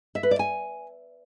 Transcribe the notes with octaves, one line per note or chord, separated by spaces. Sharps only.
E5
B4
D5
G#5